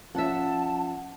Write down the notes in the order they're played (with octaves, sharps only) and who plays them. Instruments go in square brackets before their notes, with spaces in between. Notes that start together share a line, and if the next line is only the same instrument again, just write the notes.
[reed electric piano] F3 C#4 F4 [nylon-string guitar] E5 F#5 [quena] A5